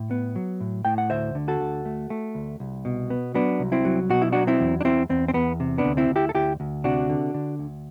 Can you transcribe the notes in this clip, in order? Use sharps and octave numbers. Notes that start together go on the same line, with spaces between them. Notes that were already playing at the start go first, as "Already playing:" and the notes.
Already playing: A2
B3
F#3
A2
A2 G5
F#5
D2 C5 E5
D3
F#4 A4
D2
A3
A3
D2
C2
B2
B3
F#3 B3 D4
C2
C4 E4
F#3
B2 F#4
E4
F#3 D4 F#4
C4 E4
E2
D4
E2 C4 E4
E2 C4
C4
E2 B3
C3
B3 D4
D2
C4 E4
D2
E4 G4
A4
D2 E4 G4
D2
C3 D4 F#4
D3
D3
D2